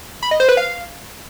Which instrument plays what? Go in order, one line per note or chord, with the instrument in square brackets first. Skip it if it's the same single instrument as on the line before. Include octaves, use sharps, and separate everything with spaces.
[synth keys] B5
D#5
C5
B4
F5